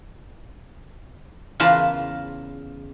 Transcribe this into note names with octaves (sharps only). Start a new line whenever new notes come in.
E2 C#3 F4 A#4 B4 A5